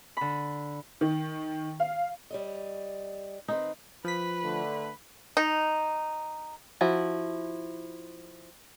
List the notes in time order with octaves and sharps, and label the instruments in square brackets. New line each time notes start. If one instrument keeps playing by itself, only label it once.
[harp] D3 B5
[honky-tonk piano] D#3
F5
[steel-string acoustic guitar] G3 C#5 D#5
[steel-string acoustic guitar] D#3 C4 B4 [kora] D#4
[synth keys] F3 B6 [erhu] B4
[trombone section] D3 A3
[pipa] D#4
[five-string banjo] F3 E4 F#4